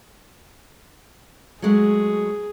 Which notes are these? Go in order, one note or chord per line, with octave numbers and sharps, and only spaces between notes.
F#3 G#3 A3 G#4